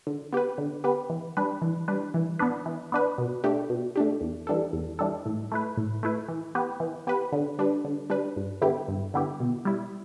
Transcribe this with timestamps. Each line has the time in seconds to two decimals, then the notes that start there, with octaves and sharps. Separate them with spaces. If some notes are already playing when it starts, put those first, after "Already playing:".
0.07 D3
0.33 B3 G4 B4
0.58 D3
0.84 B3 G4 B4
1.10 E3
1.37 G3 D4 B4
1.62 E3
1.88 G3 D4 B4
2.14 E3
2.39 B3 D4 B4
2.66 E3
2.92 B3 D4 B4
3.18 B2
3.44 A3 D4 G4
3.70 B2
3.96 A3 D4 G4
4.21 E2
4.47 E3 G3 D4 A4
4.73 E2
4.99 E3 G3 D4 A4
5.26 A2
5.52 A3 E4 B4
5.77 A2
6.03 A3 E4 B4
6.28 E3
6.55 B3 G4 B4
6.80 E3
7.07 B3 G4 B4
7.32 D3
7.59 G3 D4 B4
7.84 D3
8.10 G3 D4 B4
8.36 G2
8.62 D3 B3 E4 G4
8.88 G2
9.14 D3 B3 E4 G4
9.40 B2
9.65 G3 E4